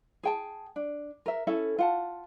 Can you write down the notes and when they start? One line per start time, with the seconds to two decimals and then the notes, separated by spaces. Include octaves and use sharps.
0.23 G#4 G5 A5
0.76 D4
1.26 A#4 E5
1.47 C#4 E4 A4 E5
1.79 F4 F#5 A5